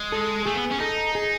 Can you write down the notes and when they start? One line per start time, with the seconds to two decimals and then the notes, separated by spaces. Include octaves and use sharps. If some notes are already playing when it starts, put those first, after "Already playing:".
Already playing: G#3
0.12 A4
0.45 A3 G#4
0.55 B3
0.71 C#4
0.80 D#4 A4
1.15 G#4